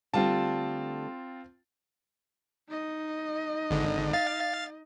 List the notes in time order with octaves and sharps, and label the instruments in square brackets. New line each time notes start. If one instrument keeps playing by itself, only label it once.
[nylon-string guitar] D3 G3 A3 [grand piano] C4 F4 A5
[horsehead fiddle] D#4 D#5
[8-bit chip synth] G#1 D3
F5 A6